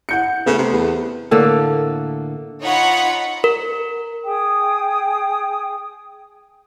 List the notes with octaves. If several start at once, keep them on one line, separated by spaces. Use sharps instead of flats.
F#5 G6 C#7
C#3 A3 B3
C3
E2
A2 D3 A#3 A4
D#4 F4 C#5 F#5 B5
A#4
G#4 G5 D#6